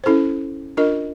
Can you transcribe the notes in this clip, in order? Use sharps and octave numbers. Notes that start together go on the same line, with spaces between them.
C#4 E4 A4 C5
D4 F4 A#4 D#5